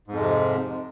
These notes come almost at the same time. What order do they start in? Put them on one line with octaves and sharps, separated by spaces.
G#2 F2 G#3 C3